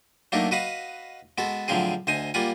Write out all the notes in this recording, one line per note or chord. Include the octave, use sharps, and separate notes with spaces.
F#3 A3 A#3 D4 D#4
F#4 B4 D#5 F5 F#5
G#3 B3 F#4 A4
A2 D3 F3 F#3 C4 G#4
D2 C5 D#5 G#5
G3 A#3 F4 F#5 G#5